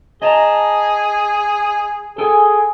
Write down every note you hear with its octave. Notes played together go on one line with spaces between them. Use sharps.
G#4 D#5 A5 A#5
G#4 A4 G5 G#5